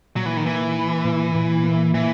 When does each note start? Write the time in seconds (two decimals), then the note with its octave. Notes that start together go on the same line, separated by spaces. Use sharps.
0.16 A#2 F#3
0.26 E3
0.37 D#3
0.46 E3 A#3
0.75 E4
1.05 A#2
1.35 A#2
1.64 A#3
1.94 A#2 E3